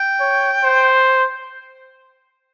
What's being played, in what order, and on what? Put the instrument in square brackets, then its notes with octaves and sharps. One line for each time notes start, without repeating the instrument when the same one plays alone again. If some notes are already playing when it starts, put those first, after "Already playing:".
Already playing: [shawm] G5
[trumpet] C#5
C5